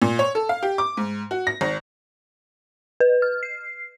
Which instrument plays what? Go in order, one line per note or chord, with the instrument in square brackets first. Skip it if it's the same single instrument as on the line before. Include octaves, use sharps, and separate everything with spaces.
[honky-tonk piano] A#2
C#5
A4
F5
G4
D6
G#2
F#4
A#6
G#1
[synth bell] B4
F6
C7